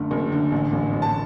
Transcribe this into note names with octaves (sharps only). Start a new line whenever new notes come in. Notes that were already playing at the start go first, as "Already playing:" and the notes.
Already playing: F#1 F#2 D3 A3
F#1
D3
A1
A1
A1
A5